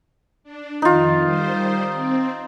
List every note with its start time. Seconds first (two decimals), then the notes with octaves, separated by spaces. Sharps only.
0.44 D4
0.82 F2 D#3 D#4 F4
1.24 D#3 G3 C5
1.88 C4